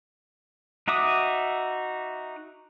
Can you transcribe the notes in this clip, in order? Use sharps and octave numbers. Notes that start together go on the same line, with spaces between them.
D#4 F#4 E5 D6 D#6